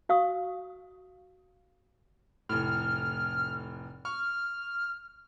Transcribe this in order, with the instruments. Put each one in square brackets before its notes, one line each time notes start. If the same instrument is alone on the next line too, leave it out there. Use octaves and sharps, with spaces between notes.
[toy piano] F#4 F5 C#6 D#6
[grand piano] F1 A2 [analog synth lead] F6
[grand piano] C#6 [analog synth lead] F6